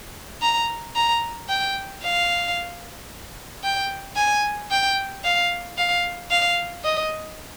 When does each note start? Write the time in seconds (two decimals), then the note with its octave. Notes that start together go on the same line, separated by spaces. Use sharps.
0.42 A#5
0.96 A#5
1.49 G5
2.03 F5
3.63 G5
4.16 G#5
4.71 G5
5.24 F5
5.77 F5
6.31 F5
6.84 D#5